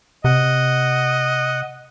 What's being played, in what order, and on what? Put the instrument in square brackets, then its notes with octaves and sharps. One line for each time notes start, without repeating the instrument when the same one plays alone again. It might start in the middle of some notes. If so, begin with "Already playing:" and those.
[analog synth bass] C3 [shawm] D#5 [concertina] F#5